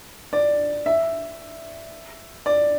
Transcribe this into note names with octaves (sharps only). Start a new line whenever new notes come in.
D5
E5
D5